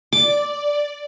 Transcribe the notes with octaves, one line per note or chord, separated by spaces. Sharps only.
D5 D6